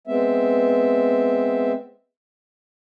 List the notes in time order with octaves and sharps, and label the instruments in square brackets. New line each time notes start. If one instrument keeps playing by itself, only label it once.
[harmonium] G#3 B3 C4 E5